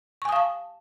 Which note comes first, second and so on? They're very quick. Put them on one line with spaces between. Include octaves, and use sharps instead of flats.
C#6 G#5 D#6 F5 A5